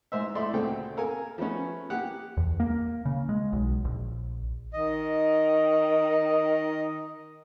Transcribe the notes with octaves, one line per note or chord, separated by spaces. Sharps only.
G#2 C5 E5
A3 E4 D5 C6
D2 A#2 C#3 C4 A4 G5
A4 A#4 F5 G#5
F3 A3 B3 C#4
A#3 G4 F#5
E2
A#3
C#3
G#3
B1
A#1
D#3 D#5